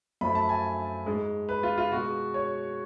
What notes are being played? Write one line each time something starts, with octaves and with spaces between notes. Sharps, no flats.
F#2 F3 A3 B5
A5
G#5
G#2 G#3
B4
F4
F4
B2 G#3 F#4
C#5